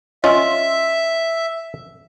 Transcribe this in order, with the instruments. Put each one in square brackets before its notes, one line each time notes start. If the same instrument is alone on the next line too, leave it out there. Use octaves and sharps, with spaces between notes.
[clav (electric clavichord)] C#4 F4 [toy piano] D#5 C6 [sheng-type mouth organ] E5